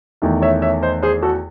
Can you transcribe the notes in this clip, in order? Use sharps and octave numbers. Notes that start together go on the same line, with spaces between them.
E2 D#3 A3
C#5 E5
C#5 E5
C5 D#5
G#4 C5
F#4 A4